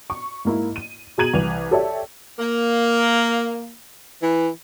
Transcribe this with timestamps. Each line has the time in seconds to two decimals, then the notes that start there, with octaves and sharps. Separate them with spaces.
0.10 C#6
0.45 G#2 A#3 E4
0.76 D#7
1.18 B2 G#4 A#5 G#6 D#7 F#7
1.33 C2 E3 F7
1.71 G4 A4 C#5 D5 E5
2.39 A#3
4.22 E3